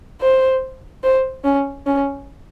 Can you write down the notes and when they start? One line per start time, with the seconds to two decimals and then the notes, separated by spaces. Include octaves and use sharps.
0.21 C5
1.03 C5
1.44 C#4
1.86 C#4